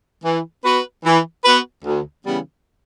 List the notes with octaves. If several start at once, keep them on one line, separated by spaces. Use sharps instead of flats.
E3
B3 F#4 B4
E3
B3 F#4 B4
D2
C#3 E3 G3 B3